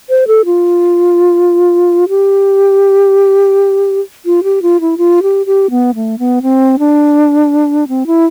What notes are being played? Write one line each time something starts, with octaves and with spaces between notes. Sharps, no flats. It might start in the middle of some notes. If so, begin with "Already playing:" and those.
C5
A4
F4
G4
F4
G4
F4
E4
F4
G4
G4
B3
A3
B3
C4
D4
C4
E4